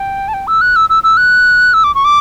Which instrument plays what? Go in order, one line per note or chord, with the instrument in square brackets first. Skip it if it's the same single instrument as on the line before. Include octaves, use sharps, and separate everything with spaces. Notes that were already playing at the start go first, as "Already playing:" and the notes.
Already playing: [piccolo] G5
A5
G5
E6
F#6
E6
E6
E6
F#6
E6
D6
C#6
D6